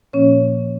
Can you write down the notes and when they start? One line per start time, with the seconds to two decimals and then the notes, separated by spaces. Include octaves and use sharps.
0.13 A#2 F3 A#3 C#4 C#5